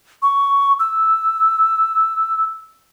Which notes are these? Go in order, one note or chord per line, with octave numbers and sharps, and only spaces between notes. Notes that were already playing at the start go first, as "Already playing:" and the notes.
C#6
E6